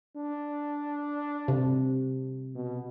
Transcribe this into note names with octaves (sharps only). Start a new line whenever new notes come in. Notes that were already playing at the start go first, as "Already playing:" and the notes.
D4
C3
B2